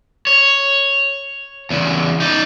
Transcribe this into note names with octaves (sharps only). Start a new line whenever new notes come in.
C#5
E2 C#3
D#4 D5